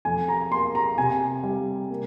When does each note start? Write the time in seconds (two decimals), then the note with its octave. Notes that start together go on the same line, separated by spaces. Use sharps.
0.05 F2 G#5
0.28 A#5
0.51 A#3 C6
0.75 A#5
0.98 C3 G#5
1.44 G3
1.90 A#3